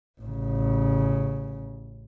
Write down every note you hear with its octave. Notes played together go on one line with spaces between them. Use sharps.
A1 C#3